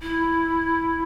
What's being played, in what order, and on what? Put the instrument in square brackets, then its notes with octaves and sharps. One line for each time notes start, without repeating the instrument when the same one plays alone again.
[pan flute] E4